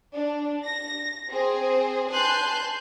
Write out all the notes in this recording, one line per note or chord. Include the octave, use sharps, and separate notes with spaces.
D4
A#6
C4 G#4 C5
B4 G#5 A5 C6 F#6 G6